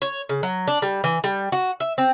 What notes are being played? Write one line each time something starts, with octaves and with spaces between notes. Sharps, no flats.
C#5
C#3
F#3
D4
G3
E3
G3
F#4
E5
C4